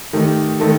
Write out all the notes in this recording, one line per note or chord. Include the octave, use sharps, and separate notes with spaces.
D#3 A3 D#4 G4
D#3 A3 D#4 A4